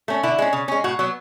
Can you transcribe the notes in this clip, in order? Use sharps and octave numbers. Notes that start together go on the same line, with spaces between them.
A3 C#4
D3 E4
G#3 C#4
C#3
G#3 C#4
A2 F#4
F#3 B3